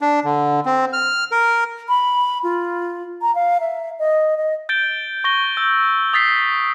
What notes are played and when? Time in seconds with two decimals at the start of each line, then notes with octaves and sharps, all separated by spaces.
0.01 D4
0.24 D3
0.66 C4
0.93 F6
1.32 A#4
1.88 B5
2.43 F4
3.22 A#5
3.35 F5
3.61 E5
3.99 D#5
4.37 D#5
4.69 G6 A6 D7 G7
5.24 C#6 A#6 G7
5.57 E6 G6
6.13 D#6 A6 B6 C7